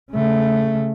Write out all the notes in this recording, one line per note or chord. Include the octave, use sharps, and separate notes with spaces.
C#3 A3